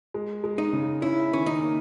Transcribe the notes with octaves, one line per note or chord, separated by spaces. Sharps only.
G#3
G#3
D#4
C#3
C#4 E4
D#3 C#4
D#4
A#3